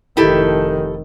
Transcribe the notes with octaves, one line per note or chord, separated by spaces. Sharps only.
F1 D#3 E4 G4 A4